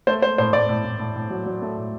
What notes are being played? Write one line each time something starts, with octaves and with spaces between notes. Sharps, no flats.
A3 C5
A3 C5
A2 C5
A2 D5
A2
A2
A2
A2
F#3
F#3
A3
A2